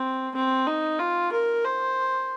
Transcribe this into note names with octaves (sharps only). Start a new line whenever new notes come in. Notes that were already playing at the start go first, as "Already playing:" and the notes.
Already playing: C4
C4
D#4
F4
A#4
C5